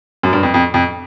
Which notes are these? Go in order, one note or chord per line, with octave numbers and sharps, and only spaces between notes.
F#2
G2
F2
F2
F2